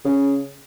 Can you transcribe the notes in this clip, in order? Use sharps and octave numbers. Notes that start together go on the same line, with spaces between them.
C#3